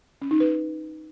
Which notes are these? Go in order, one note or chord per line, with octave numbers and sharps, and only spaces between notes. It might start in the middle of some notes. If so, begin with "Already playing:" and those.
C#4
D#4
B4